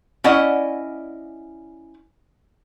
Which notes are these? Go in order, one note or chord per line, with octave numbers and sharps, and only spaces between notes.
C#4 E4 D5 D#5 F#5